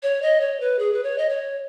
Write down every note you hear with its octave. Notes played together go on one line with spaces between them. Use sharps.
C#5
D#5
C#5
B4
G#4
B4
C#5
D#5
C#5